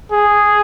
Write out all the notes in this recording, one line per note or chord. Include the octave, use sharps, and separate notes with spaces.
G#4